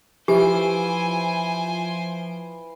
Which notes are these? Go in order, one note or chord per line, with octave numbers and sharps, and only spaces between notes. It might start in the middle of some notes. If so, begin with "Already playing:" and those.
E3 F3 G4 C5 G#5 D7